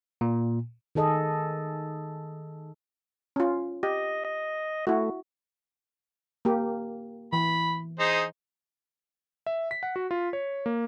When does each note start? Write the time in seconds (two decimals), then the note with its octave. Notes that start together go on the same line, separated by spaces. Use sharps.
0.21 A#2
0.95 D#3 G#4 A4 D#5
3.36 C#4 F4
3.83 G4 D#5
4.25 D#5
4.87 A3 E4 F#4
6.45 A#3 G4
7.33 E3 B5
8.00 D#4 G#4 C5
9.46 E5
9.71 B6
9.83 F#5
9.96 F#4
10.11 F4
10.33 C#5
10.66 A#3